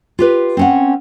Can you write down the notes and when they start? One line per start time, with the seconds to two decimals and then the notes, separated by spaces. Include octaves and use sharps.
0.19 F4 G4 B4
0.57 C4 C#4 F#5